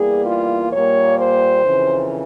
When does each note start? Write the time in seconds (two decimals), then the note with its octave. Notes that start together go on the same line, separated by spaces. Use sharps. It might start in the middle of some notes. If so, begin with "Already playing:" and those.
Already playing: E2 E3 G3 A#3 G#4
0.26 F4
0.72 A#2 G3 A#3 C#5
1.18 C5
1.64 F2 C#3 E3